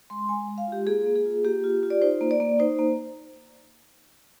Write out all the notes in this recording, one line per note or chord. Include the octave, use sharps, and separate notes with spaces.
G#3 C6
G#3 G#5
G#3
F5
F4 G4
A#3 G#4
A#3
G#4
F4
A#3 G4
F4
F4
D5
D#4 C5
A#3
D5
A#3
D#4 C5
A#3